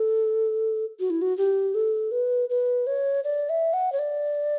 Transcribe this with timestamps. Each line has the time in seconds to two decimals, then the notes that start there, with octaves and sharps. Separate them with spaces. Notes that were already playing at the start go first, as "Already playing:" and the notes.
Already playing: A4
1.00 F#4
1.10 E4
1.22 F#4
1.38 G4
1.74 A4
2.11 B4
2.50 B4
2.87 C#5
3.24 D5
3.49 E5
3.73 F#5
3.92 C#5
3.99 D5